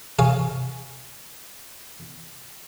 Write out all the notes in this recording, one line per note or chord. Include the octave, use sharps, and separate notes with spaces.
G#4 C#5 F5 G#5